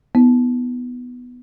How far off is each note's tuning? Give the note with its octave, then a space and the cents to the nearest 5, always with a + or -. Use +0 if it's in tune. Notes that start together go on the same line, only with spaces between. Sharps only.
B3 +0 E4 -45